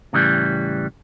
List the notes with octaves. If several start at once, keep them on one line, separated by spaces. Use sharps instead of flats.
A2 C#3 E3 G3